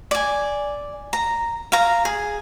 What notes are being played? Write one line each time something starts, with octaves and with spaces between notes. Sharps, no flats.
D5 G#5
A#5
F5 A#5
G#4